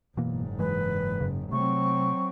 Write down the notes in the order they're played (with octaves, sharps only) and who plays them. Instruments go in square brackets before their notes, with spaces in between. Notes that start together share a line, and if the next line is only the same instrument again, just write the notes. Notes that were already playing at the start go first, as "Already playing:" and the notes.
[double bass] F#1 G#2 [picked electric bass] B2 E3 A#3
[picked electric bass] E3 G#3 [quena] B4
[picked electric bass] F#2 C#3
[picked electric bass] C3 A3 [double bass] F#3 C4 [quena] C#6